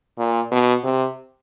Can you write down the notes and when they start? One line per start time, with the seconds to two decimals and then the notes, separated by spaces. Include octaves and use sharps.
0.18 A#2
0.52 B2
0.84 C3